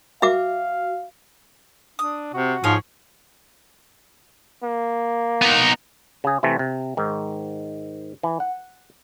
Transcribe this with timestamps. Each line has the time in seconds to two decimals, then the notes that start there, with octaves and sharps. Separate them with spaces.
0.22 F#4 E5 F5 D6
1.99 D4 D#6
2.34 C3 F#4
2.64 G#2 F3 G#4 C#5
4.63 A#3
5.42 B3 D#4
6.24 C#3 G#4
6.43 C3 E3 A3 C4
6.59 C3
6.97 G#2 D#3
8.23 E3
8.40 F#5